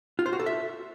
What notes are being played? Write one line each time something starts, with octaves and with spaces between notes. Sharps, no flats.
F4
C5
F#4
A4
E5